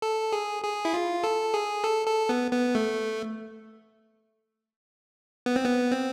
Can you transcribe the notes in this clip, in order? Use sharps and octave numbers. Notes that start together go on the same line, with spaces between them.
A4
G#4
G#4
E4
F4
A4
G#4
A4
A4
B3
B3
A3
B3
C4
B3
C4